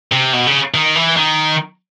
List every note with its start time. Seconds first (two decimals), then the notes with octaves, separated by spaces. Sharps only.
0.12 C3
0.33 B2
0.46 C#3
0.74 D#3
0.95 E3
1.17 D#3